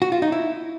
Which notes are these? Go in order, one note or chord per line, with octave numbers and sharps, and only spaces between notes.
F#4
F4
D#4
E4